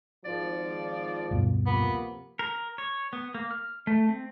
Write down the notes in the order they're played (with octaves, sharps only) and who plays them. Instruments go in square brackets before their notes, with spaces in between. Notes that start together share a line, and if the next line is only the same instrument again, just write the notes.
[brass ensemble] G#1 F3 [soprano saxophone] D5
[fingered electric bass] D1 G2 B2
[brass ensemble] C3 F3 A#3 [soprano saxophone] B3
[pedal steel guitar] A#4
C#5
B3
A#3
F6
A3
C4